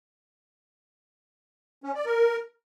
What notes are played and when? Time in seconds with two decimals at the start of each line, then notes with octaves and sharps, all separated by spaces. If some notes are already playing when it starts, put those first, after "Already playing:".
1.84 C#4
1.95 D5
2.06 A#4